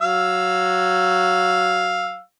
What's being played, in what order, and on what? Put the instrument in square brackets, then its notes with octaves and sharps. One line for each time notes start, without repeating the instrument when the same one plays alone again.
[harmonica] F#3 F5 E6